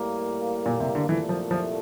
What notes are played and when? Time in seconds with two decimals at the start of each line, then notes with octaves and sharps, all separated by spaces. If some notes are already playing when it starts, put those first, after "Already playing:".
Already playing: A2 G3 A#3
0.66 A#2
0.80 C3
0.95 D3
1.08 C2 A#2 E3 A3
1.29 F3
1.51 F3